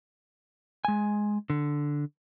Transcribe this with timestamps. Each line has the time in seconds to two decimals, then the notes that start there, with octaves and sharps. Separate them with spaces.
0.85 G#3 G#5
1.50 D3